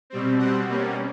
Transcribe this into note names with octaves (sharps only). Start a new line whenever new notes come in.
B2 G3 C4
B2 G3 C4 F#5
B2 G3 A#3 C#4